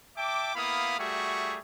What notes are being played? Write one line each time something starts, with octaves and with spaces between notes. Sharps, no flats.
E5 G5 A5 D6
A#3 B3 E4 F5 B5 D#6
G3 A3 F#4 G#4 E5 C#6